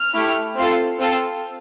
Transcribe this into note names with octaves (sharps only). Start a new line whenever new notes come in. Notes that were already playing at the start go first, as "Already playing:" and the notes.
Already playing: F6
A3 E4 G4
C4 F4 A4
C4 F4 A4